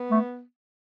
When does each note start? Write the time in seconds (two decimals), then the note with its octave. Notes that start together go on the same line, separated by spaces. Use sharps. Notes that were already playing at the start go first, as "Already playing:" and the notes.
Already playing: B3
0.11 A3